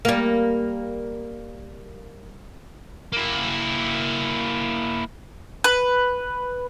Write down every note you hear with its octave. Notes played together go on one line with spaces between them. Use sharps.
G3 A#3
A#3 E4
B4